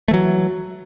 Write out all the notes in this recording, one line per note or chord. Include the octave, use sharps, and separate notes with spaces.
E3 F#3 A3